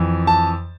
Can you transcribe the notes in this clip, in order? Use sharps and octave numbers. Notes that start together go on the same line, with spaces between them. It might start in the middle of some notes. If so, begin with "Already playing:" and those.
Already playing: F2 E3
A5